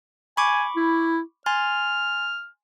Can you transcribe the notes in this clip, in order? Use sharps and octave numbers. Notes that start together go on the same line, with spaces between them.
G#5 B5 C#6 D6
E4
G#5 C6 F6 A6